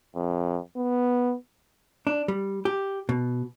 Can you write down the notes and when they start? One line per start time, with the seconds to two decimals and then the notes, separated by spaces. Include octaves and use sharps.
0.15 F2
0.77 B3
2.07 D4
2.28 G3
2.65 G4
3.09 B2